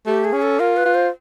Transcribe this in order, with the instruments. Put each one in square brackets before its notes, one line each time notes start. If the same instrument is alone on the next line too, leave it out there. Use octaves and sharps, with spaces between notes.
[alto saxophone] A3 [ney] G4
[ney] G#4
[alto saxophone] C#4
[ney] A4
[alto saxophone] F4 [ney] A#4
[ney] B4
[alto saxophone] F4
[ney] C5